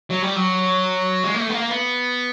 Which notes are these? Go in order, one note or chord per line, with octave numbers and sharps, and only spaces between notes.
F#3
G3
F#3
G#3
A#3
A3
B3
A#3
B3